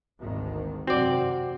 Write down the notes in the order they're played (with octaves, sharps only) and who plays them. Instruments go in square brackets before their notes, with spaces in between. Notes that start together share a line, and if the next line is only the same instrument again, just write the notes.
[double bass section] G#1 D2 D#3
[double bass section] F#2 C3 [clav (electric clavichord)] C4 D5 [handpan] F#4